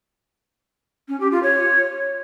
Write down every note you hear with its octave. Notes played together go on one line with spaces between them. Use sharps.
C#4
G4
F4
C#5